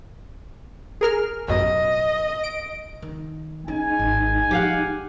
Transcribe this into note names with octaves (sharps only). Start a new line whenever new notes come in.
G#4 A#4 F6
A1 F#2 B2 D#5
D7
D#3
G#3 C#4 D#4 G#5
G#1
F3 G4 F5 F#5